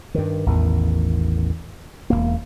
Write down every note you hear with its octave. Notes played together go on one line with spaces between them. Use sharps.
G2 D#3
A1 E2 D#3
E1 F2 A#3